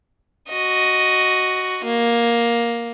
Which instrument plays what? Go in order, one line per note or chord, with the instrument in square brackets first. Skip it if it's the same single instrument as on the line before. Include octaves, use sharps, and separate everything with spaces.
[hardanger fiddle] F#4 D#5
A#3